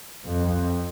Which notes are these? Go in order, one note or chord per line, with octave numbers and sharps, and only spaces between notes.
F2